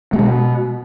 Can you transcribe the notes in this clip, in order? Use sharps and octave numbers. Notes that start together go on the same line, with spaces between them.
A3
B2 G#3